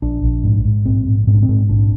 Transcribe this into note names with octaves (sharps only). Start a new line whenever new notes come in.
A#1 D4
A#1
G#2
G#2
A#1 C4
G#2
G#2 C4
D4
C4
G#2
A#1 D4